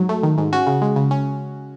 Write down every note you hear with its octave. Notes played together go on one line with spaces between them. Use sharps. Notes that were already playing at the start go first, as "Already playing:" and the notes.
Already playing: G#2 F#3
A3
D#3
G#2
C#4 F#4
C#3
G#3
C#3
C#4